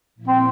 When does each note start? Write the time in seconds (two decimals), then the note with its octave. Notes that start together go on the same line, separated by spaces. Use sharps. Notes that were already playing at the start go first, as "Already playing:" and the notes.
0.15 A#2 F3 A#3 E4
0.28 C4